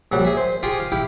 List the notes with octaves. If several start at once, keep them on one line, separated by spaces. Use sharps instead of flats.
A#1 F#3 G3 F#5
G#4 E5
C5
F4 G4 G#4 G5 C#6 D#6
F5
E4 G4 F5 G5